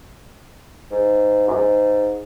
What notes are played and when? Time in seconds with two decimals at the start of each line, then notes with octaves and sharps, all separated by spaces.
0.91 G#2
1.48 F#2
1.54 G#2